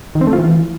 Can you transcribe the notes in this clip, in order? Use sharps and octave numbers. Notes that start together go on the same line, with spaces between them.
D#3
C4
A3
F4
E3